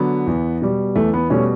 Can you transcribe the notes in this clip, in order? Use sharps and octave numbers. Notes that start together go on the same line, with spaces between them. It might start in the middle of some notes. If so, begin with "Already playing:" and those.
Already playing: D3 F#3 B3
E2
B2 G3
E2 A3
B3
B2 G3 A3 C#4